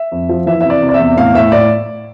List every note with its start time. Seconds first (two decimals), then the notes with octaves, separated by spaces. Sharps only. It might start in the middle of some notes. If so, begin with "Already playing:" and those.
Already playing: E5
0.12 F2
0.29 F3
0.46 E3 E5
0.61 C3 E5
0.70 D5
0.82 C3
0.89 D5
0.94 E2 E5
1.17 A2 F5
1.35 A2 E5
1.52 A2 D5